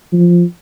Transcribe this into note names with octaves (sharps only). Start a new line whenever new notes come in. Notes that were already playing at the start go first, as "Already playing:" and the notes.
F3